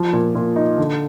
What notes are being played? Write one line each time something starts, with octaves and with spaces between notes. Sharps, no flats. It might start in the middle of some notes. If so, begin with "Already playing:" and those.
Already playing: F3
A#2
A#2
D#4
D3